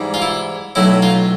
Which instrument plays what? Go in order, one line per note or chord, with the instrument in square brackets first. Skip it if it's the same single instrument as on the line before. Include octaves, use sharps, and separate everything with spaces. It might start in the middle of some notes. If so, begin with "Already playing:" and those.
Already playing: [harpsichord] G#2 E3 G3
F4
E4
B1 A2 F#3 A3 E4
F4